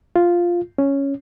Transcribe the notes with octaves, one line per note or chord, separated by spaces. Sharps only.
F4
C#4